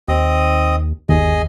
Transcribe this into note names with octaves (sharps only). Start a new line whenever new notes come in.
D#2 C4 D#5 D#6
G1 D#2 G#4 D#5